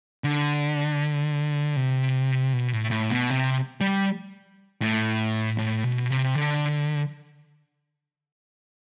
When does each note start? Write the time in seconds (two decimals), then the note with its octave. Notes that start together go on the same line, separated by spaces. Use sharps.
0.24 D3
1.76 C3
2.53 B2
2.73 A2
2.91 A2
3.11 B2
3.30 C3
3.81 G3
4.82 A2
5.58 A2
5.84 B2
6.10 C3
6.35 D3